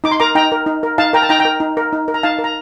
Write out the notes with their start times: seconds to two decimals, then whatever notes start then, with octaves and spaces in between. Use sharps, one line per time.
0.04 D#4 D6
0.11 C6
0.20 A#4 A#5 D6
0.35 D#4 G5 A#5
0.52 A#4
0.66 D#4
0.83 A#4
0.98 D#4 F5 A5
1.13 A#4 G5 A#5
1.22 A5
1.29 D#4 G5 A#5
1.39 G5 A#5
1.45 A#4
1.60 D#4
1.77 A#4
1.93 D#4
2.08 A#4
2.14 A#5
2.23 D#4 F5 A5
2.39 A#4
2.44 A#5